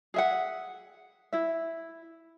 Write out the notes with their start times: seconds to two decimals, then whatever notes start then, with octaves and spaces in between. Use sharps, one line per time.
0.14 G#4 E5 F#5
1.33 E4 E5